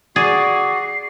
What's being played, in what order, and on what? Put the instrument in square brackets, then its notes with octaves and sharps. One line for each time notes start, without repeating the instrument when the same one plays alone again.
[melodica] F#4 [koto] G#4 [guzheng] D5 [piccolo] C7